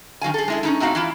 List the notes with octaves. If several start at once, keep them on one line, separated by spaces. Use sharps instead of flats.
D#3 F#3 F5 G#5
G#4 A4
G#3 E4 G#4
C#4 D#4 E4
A2 C4 D#4 F#4 F5
E3 E4 F4